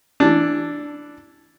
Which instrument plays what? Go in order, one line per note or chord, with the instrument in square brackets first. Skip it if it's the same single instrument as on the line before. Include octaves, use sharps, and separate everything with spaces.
[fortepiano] E3 D4